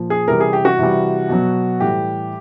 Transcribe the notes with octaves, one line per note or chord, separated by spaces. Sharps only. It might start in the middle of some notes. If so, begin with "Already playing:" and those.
Already playing: A#2 F3
G#4
C3 E3 G3 A#4
G#4
G4
F#4
C3 E3 G3
B2 F#3
A2 E3 G3 G4